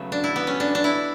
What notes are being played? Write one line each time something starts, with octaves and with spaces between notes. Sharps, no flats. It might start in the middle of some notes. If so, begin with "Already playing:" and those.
Already playing: C#3 F#3 A3 B3
D4
E4
B3
C#4
D4
D4
E4